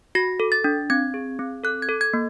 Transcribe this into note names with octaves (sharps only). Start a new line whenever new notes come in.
F#4 A#6
A4
A6
D4
C4 G#6
G#4
C4
A4 F#6
G#6
A4
G#6
A#3